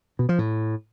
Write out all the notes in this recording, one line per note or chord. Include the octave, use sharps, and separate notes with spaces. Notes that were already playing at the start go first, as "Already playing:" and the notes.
B2
F3
A2